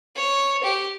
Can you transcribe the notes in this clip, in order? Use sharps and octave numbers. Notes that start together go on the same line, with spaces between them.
C#5
G4